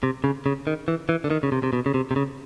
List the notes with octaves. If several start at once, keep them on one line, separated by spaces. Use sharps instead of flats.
C3
C#3
C#3
D#3
E3
E3
D3
D#3
C#3
C3
C3
B2
C#3
C3
C3
C#3